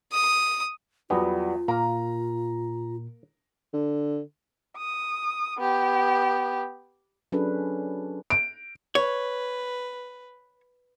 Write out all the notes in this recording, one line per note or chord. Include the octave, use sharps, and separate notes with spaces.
D#6
E2 F#3 G3 B3 F4
A#2 A#3 A#4 A#5
D3
D#6
B3 G4
F#3 C#4 D4 G#4 A4 B4
D7
B4 C#5